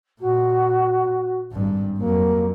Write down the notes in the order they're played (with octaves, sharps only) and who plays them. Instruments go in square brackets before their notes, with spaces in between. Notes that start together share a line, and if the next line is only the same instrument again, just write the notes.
[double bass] A#2 [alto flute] F#4
[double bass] G#1 G2
[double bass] F2 F#3 [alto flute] A#3